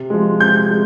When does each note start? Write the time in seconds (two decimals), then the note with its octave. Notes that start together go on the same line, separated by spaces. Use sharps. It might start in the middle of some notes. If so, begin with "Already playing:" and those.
Already playing: C3
0.10 F3 G#3
0.40 C3 G6
0.70 G#3